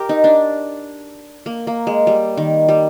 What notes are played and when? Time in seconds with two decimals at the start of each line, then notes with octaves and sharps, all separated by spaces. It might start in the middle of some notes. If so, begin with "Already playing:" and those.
Already playing: G4 A#4
0.09 D#4
0.24 D4
1.46 A#3
1.67 A#3
1.87 G#3
2.07 G3
2.37 D#3
2.69 G3